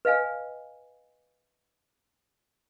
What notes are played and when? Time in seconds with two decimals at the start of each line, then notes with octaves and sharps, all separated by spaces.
0.05 B4 D#5 F5 G#5